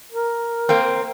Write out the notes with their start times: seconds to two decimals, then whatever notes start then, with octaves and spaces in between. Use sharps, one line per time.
0.12 A#4
0.69 A#3 C4